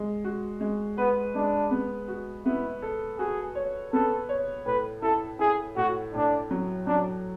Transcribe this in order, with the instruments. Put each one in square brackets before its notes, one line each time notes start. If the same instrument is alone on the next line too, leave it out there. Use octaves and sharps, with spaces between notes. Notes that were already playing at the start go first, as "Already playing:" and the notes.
Already playing: [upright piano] G#3
F#4
G#3
[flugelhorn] B3 [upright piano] B4
[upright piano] G#3 [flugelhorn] D4
[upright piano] B3
F#4
[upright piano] B3 [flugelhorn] E4
[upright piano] A4
[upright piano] F#4 [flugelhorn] G#4
[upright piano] C#5
[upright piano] B3 [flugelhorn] A4
[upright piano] C#5
[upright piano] A2 [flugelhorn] B4
[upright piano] E4 [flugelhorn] A4
[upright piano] E4 [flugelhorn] G#4
[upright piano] A2 [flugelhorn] F#4
[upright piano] A2 [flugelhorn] D4
[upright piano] F#3
[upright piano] F#3 [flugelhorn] D4